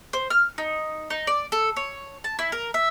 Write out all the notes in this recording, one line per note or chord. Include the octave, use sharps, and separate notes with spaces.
C5
F6
D#4
D#4
D5
A4
C#5
A5
E4
A#4
E5